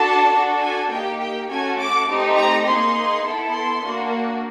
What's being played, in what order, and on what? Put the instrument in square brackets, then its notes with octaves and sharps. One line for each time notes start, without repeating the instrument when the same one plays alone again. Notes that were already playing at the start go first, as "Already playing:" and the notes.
Already playing: [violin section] D4 F#4 A4 A5
D4 F#4 A4
G#5
A#3 D#4 G4 G5
G5
A3 C#4 F#4 A4 G#5
D6
A3 C4 D#4 G4
A#5
A#3 D#4 G#4 C6
B3 E4 A4
C6
A#3 D4 F#4